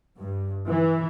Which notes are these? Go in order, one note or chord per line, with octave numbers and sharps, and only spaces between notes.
G2
E3